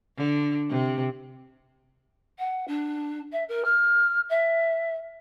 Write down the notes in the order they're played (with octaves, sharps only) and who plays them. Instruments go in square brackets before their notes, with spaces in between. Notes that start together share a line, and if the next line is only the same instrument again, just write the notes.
[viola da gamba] D3
C3
[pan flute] F#5
D4
E5
A#4
F6
E5